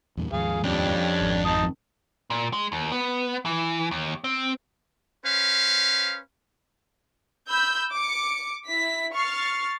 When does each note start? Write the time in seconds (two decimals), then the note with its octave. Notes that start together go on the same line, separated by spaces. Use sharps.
0.17 E2 G2 A#2
0.32 D#2 G#2 F3 G#4 F5
0.63 F2 G3 C#4 D4
1.21 G#1
1.45 D#4 A5 D#6
2.30 A#2
2.53 G#3
2.72 D#2
2.92 B3
3.45 E3
3.91 D#2
4.24 C4
5.25 C#4 B4 C5 F5
7.48 B5 E6 G6
7.94 D6 C#7
8.66 E4 B6
9.14 C#6 F6 A6 C7